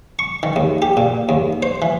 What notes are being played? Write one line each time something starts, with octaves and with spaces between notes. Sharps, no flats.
C#6
D#3
D#2
G4
A#2
D#2
C5
E3